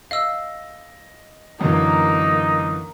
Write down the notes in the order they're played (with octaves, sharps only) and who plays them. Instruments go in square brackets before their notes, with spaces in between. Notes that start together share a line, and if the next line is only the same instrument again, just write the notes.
[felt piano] D#5 [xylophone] F5 E6
[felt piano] F#2 D3 E3 [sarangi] A#3 [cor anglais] D#4